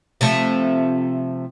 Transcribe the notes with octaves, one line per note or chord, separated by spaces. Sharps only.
C3 F3 A3